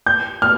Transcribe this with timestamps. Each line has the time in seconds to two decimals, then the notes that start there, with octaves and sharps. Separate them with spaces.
0.07 G6
0.42 F6